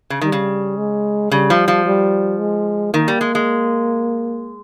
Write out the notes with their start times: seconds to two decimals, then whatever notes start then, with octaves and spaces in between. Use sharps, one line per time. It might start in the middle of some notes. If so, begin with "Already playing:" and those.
0.10 C#3
0.21 D#3 G3
0.32 C#3
0.77 G#3
1.31 C#3 G3
1.50 F3
1.68 F3
1.86 G3
2.40 G#3
2.94 D#3 A#3
3.08 G3
3.21 G#3
3.35 G#3